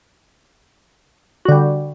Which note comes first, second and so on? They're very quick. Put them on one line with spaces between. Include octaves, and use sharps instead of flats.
F#4 D3 G3